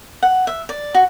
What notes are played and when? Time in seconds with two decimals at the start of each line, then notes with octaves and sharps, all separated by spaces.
0.23 F#5
0.47 E5
0.69 D5
0.95 F#4